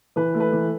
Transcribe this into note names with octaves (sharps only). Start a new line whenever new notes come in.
E3 B4
A3
B4
E3